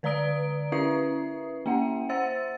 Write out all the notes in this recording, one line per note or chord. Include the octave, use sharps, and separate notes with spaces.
D3 B4 D5 A#5 D#6 D7
C#4 E4 B4 E5 D#6 C7
A#3 C#4 E5 F#5
C5 E5 F#5 E6 A6